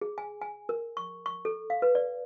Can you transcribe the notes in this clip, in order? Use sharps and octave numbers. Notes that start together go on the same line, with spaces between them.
G#4
G#5
G#5
A#4
C#6
C#6
A4
F5
B4
D5